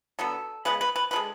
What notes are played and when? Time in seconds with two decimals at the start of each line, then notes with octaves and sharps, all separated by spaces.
0.19 D3 F#3 B3 A4
0.65 C#3 G#3 B3 B4
0.81 B4
0.96 B4
1.11 D3 F3 G#3 B4